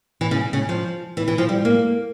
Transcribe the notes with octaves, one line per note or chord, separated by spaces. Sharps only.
E3
C#3
C#3
F3
E3
E3
F3
G3
A#3